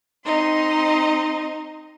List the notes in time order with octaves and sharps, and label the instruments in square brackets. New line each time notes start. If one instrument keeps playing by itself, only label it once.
[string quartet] C4 D#4 D#5 C6